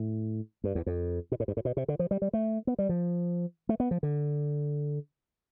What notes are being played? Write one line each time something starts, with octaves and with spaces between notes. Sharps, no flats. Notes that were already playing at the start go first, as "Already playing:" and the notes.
Already playing: A2
G2
E2
F2
B2
A2
G2
A2
B2
C3
D3
F3
G3
G3
A3
B3
G3
F3
A3
B3
F3
D3